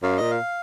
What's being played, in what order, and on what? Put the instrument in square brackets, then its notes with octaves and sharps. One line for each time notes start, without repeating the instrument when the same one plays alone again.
[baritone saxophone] F#2 [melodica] F5
[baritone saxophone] A#2 [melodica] D#5
[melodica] F5